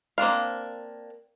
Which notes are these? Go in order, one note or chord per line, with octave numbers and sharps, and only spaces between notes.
A#3 C4 D4 F5